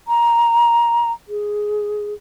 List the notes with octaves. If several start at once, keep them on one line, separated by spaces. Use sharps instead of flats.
A#5
G#4